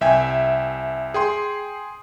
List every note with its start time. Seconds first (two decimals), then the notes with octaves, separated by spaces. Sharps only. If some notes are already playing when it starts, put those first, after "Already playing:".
0.01 C2 E5 G5 G#5
1.14 G#4 G5 C6